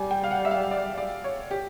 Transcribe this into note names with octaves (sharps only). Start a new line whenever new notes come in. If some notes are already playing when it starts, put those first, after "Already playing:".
Already playing: G3 G#5
G5
F5
F#5
E5
F5
D5
D5
C#5
G4